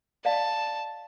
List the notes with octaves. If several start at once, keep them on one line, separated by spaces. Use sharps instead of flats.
D5 D#5 F5 A5